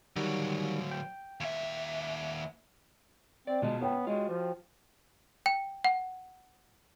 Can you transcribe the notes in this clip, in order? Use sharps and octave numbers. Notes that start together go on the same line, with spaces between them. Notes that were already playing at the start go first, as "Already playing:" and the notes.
D3 D#3 F#3 G3
G5
D#2 E5
C4 D5
B2 G#3 C#4 F4 A5
B3 C#5 G5
G#3 F4 F#4
F3
G5
F#5